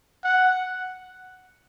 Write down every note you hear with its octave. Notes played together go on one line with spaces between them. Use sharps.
F#5